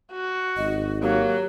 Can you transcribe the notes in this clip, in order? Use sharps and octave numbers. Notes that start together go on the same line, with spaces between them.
F#4
G#1 D#5
F#3 A#3 G4